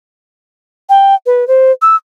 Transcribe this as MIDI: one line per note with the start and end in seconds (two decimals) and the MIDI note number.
0.89 1.15 79
1.26 1.47 71
1.47 1.71 72
1.82 1.96 88